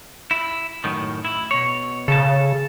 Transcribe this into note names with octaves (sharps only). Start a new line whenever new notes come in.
E4
F#2 A2 D#3
E4
B2 C#5
C#3 A4 A5